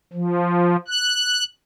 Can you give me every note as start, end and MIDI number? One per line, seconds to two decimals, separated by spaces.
0.13 0.76 53
0.88 1.44 90